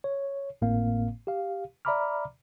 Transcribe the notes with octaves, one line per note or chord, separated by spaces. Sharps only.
C#5
G#1 A2 A#3 C4 F5
G4 F5
D5 E5 A#5 B5 D6 F6